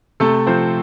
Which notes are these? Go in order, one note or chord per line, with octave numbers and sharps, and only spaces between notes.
C3 A3 A4
F3 C4 C5